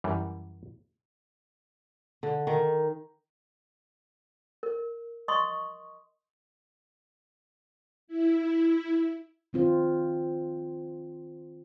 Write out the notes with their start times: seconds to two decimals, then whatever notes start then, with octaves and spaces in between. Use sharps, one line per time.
0.04 F#2 E3 G3 A#3
2.23 D3
2.47 D#3
4.63 A#4
5.28 D#5 C6 C#6 D#6
8.08 E4
9.53 D#3 C4 F4 C5